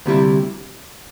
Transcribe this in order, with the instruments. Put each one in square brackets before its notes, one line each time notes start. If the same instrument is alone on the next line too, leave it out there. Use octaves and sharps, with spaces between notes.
[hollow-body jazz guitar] D2 C3 G3 E4